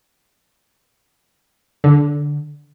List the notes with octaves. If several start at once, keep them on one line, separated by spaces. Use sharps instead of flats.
D3